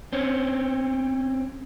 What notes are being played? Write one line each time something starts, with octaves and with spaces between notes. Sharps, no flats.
C4 C#4